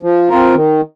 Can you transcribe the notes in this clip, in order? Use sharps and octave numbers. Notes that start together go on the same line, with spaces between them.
F3
C4 F4 A#4
D#3